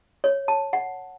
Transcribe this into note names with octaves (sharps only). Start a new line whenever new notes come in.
C#5
A5
F#5